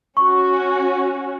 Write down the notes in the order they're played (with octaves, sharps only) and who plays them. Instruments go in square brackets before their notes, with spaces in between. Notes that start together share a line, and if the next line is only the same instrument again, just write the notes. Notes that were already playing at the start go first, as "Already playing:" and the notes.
[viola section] C#4 F#4 [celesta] C#6